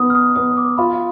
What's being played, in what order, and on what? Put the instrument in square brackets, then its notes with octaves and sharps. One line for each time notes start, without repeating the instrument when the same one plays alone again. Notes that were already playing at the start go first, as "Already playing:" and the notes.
Already playing: [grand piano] B3 D#4 [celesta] D#6
[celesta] F6
D#6
[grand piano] B3 [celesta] D#6
[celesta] D6
[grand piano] F4 [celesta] B5